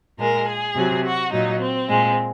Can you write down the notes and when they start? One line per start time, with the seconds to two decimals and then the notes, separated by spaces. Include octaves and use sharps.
0.19 A#2 G#3 A#4
0.48 G#4
0.76 C3 F#3
1.04 F#4
1.32 A#2 F#3 D#4
1.61 C4
1.89 A#2 G#3